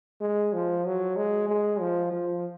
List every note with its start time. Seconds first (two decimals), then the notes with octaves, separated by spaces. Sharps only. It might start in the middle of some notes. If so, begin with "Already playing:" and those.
0.21 G#3
0.53 F3
0.85 F#3
1.17 G#3
1.49 G#3
1.80 F3
2.12 F3